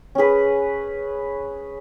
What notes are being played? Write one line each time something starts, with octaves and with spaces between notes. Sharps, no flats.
C#4 G#4 B4